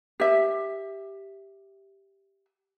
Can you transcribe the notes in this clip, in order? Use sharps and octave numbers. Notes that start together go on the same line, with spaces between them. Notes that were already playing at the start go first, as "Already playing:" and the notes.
G4 E5